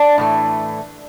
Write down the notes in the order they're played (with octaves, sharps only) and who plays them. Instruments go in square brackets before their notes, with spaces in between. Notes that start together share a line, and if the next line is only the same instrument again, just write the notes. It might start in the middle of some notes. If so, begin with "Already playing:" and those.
Already playing: [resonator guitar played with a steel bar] D4
A2 E3 A3